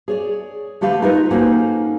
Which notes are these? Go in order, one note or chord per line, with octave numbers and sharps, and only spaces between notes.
G#4 C#5 D5
D3 A3 G4 B4 F5 A5
D#4 F4 A#4 B4 D#5
A#3 C#4 D#4 F#4 A4 C5